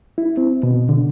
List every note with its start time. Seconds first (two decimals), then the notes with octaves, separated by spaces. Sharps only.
0.18 E4
0.37 C4
0.63 B2
0.89 D3